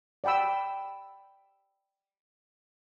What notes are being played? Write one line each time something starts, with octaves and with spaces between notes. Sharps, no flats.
D5 F#5 G5 B5 E6